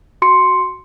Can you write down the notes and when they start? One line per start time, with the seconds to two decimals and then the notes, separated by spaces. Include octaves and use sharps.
0.22 F#4 C6 C#7